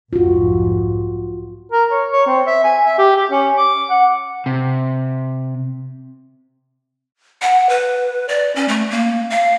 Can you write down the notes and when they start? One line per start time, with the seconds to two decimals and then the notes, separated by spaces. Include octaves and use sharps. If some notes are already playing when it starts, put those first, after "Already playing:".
0.13 B1 F2 G#2 F4 F#4
1.72 A#4
1.91 C#5
2.12 C#5
2.27 C4
2.47 E5
2.64 G#5
2.85 E5
2.98 G4
3.16 G4
3.31 C#4
3.57 D6
3.90 F#5
4.46 C3
7.42 F#5
7.69 B4
8.29 D5
8.56 C#4
8.68 A3
8.90 A#3
9.30 F5